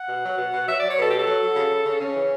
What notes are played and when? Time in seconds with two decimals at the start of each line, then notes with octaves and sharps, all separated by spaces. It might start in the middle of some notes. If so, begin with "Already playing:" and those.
Already playing: F#5
0.09 B2
0.23 F#3
0.38 B2
0.53 B2
0.67 F#3 E5
0.79 F#3 D5
0.90 C#5
0.97 B2 A4
1.10 F#3 G4
1.19 A4
1.27 F#3
1.42 F#3
1.56 C#3
1.71 C#3
1.86 C#3
2.01 C#3 C#4
2.15 E3